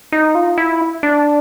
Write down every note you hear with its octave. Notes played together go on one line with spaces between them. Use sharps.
D#4
F4
E4
D4